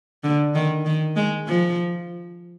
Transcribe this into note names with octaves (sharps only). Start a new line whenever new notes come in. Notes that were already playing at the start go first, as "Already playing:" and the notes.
D3
D#3
D#3
G#3
F3